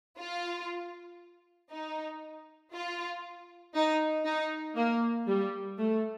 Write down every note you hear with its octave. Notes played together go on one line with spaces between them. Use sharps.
F4
D#4
F4
D#4
D#4
A#3
G3
A3